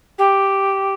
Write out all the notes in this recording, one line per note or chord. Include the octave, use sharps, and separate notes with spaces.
G4